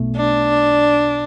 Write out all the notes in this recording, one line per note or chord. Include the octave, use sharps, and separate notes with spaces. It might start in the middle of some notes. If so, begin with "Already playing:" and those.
Already playing: B1 B2 A3
D4